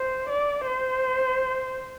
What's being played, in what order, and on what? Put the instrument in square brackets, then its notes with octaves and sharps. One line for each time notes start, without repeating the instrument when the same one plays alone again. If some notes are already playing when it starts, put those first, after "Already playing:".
Already playing: [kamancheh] C5
D5
C5